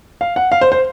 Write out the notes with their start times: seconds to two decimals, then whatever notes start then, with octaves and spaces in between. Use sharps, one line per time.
0.21 F5
0.36 F#5
0.52 F5
0.61 C5
0.72 C5